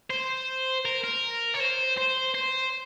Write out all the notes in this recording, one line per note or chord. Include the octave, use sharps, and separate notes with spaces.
C5
A#4
A#4
C#5
C5
C5
C5